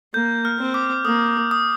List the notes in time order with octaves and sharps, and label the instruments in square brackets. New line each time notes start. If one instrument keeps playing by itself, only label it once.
[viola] A#3 [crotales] G6
[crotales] F6
[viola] C4
[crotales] D6
[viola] A#3 [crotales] D#6
[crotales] D#6